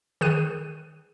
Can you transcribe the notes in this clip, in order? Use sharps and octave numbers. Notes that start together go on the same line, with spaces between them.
D#3 G#4 F#6 D#7